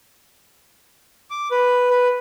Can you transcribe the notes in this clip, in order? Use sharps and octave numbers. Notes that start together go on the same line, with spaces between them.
D6
B4
B4